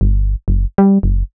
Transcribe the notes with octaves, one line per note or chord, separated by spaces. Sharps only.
G1
F#1
G3
F#1